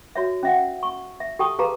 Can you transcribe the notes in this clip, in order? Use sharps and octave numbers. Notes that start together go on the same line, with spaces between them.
F#4 C#5 E5
C#4 E5 F#5
C#6
E5
G4 A4 G5 A5 C#6 D#6
G4 G#4 B4 F5 A5 A#5